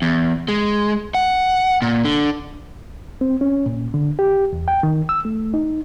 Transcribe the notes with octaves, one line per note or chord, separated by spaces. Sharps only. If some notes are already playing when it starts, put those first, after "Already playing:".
E2
G#3
F#5
A#2
D3
C4
C#4
A#2
D3
G4
E2
G5
D#3
E6
A3
D#4